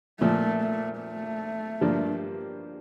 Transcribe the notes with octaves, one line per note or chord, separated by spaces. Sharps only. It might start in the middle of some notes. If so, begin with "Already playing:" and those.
A#2 F3 A3 A#3
A3
A3
G2 F3 A#3 D4